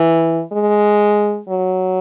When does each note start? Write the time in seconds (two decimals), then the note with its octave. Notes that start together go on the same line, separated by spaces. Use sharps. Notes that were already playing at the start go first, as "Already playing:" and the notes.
Already playing: E3
0.52 G#3
1.49 F#3